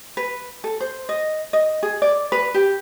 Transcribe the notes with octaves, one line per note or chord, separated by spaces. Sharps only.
B4
A4
C5
D#5
D#5
G#4
D5
B4
G4